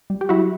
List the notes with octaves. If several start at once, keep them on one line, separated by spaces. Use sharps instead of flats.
G3
G4
F#3 E4 F#4